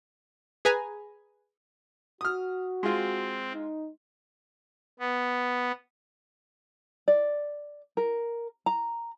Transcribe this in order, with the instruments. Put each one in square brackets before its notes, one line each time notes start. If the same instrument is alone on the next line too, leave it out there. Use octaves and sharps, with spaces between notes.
[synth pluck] G#4 B4 G#5 A#5
[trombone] F#4 [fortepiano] D#6 F6
[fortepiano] G#3 F4 [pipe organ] C4
[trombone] D#4
[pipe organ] B3
[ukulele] D5
A#4
A#5